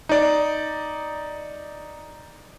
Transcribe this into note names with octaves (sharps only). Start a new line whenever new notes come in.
D#4 D5